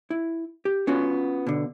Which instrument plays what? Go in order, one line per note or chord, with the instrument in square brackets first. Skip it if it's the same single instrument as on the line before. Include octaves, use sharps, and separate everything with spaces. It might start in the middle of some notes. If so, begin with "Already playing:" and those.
[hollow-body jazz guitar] E4
G4
B3 C#4 F4 F#4
B2 D3